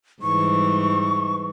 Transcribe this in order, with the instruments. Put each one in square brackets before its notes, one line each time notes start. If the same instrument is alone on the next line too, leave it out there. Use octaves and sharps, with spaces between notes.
[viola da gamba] G#2 E3 G3 [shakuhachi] C#6